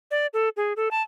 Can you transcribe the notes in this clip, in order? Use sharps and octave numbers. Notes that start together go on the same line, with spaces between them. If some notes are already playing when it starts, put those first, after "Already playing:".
D5
A4
G#4
A4
A5